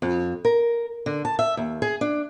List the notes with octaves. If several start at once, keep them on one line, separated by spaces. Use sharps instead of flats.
F2
A#4
D3
A5
E5
D#2
G#4
D4